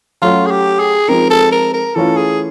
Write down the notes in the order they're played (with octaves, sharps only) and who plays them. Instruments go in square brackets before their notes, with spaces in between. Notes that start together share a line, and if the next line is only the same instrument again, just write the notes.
[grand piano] F#3 A3 C#4 F#4 [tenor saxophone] F4
[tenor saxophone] G#4
G4
G#4
[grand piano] F3 G#3 C4 D#4 [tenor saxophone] A#4
[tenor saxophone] A4
A#4
A#4
[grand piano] E3 A3 C#4 F4 [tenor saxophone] A4
[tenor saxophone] G#4